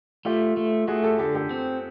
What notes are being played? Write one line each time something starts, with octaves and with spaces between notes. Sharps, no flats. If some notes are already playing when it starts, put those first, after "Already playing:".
A3 F4 G4
A3
A3 F#4 G#4
G4 A4
D3 G4 A4
G4 A4
C4